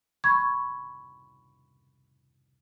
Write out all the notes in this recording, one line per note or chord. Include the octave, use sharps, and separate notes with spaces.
B5 C#6 G#6